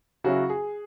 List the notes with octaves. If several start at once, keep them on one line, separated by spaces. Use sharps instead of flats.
C#3 F#3 C#4 E4 F#4
G#4